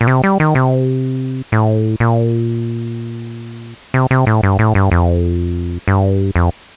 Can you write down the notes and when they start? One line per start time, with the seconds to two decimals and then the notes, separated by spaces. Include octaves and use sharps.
0.01 A#2
0.07 C3
0.24 G3
0.40 D#3
0.55 C3
1.52 A2
2.00 A#2
3.94 C3
4.11 C3
4.27 A2
4.43 G2
4.59 A2
4.75 G2
4.92 F2
5.88 G2
6.36 F2